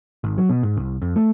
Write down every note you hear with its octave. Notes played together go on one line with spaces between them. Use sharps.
G#1
F#3
B2
G#2
C2
F2
A3